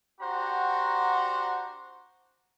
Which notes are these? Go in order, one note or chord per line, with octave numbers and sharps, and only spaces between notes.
D4 F#4 G4 C5 F#5 A#5